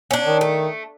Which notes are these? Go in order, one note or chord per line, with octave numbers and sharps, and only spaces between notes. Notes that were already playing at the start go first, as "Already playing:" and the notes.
C#4 D4
D#3
A3